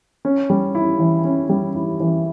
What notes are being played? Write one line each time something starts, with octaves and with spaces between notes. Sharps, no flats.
C#4
G3
E4
E3
C#4
G3
E4
E3